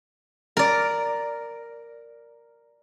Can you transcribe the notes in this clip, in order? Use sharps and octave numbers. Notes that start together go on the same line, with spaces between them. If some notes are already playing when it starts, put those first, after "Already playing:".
A#4 D5